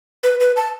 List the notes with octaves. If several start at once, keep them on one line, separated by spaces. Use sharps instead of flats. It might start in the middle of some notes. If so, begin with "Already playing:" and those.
B4
B4
A5